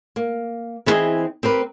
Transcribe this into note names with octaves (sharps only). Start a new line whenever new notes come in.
A#3
E3 B3 C4 E4 G#4 D#5
C4 G4 A#4 B4